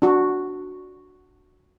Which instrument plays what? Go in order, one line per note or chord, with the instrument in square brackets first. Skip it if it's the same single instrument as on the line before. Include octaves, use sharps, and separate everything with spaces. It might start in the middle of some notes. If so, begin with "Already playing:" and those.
[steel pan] D4 F#4